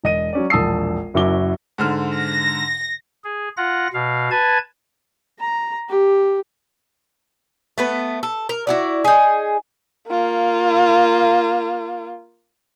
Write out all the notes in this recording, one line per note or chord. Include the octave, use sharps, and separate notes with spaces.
E1 D#5 D#7
F#3 C#4 D5
E1 A#1 A5 D#6 E6 C7
F#1 F#2 E4 F#4 D6 G7
G#2 D3 F6
A#6
G#4
F4 F#5 A#6
B2 F5
B4 G#5 A5 G#6
A#5
G4
A3 B3 B4
A4
A#4
E4 F#4 D5
D#4 G#4
A#3 F4